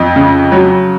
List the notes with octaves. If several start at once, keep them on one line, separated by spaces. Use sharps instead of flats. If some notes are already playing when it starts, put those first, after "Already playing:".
Already playing: F2 D#5
C#3
F#3